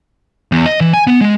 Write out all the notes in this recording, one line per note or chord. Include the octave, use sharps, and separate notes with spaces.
E2
D#5
E3
G#5
B3
G#3